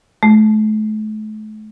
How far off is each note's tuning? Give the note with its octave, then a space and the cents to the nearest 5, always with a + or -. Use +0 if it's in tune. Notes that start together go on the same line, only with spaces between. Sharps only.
A3 -40